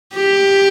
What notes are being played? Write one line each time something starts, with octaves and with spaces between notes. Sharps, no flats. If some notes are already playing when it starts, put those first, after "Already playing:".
G4